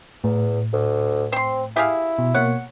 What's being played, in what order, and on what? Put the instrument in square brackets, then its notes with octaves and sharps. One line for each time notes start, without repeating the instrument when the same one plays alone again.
[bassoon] E2 [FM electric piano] A2
[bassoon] D2
[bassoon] C4 [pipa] C5 C6
[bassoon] E4 [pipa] G4 G#4 F5
[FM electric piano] B2
[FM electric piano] B2 A#3 C#5 [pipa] F#5